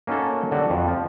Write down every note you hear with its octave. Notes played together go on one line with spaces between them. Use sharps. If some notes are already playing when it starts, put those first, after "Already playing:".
A#3 C#4 D#4 F#4 A4
D3 F#3 F#4 G4
F2
F3